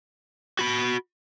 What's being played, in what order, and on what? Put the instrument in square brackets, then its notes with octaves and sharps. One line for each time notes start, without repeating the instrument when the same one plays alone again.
[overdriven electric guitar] F#4 B5